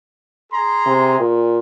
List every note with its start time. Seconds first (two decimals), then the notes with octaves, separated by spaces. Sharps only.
0.52 G#4 A#5 C6
0.86 C3
1.19 A#2